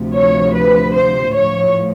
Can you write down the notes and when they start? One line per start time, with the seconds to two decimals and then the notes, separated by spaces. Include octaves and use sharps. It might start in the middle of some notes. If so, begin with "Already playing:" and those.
Already playing: D2 C3 F3
0.15 C#5
0.54 B4
0.94 C5
1.34 A2 F3 C#5